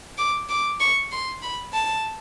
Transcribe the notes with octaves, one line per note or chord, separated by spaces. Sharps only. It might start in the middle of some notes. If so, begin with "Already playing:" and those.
D6
D6
C#6
C6
B5
A5